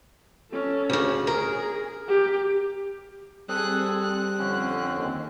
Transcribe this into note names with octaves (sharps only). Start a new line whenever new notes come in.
C#4 A4
D2 C#3
G#4 A#4
G4
G3 C4 G#4 A4 D#6 F#6
F#6
F2 D3 C#4
D#2